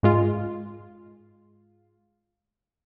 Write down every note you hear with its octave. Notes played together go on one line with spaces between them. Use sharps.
G#2 G#3 F4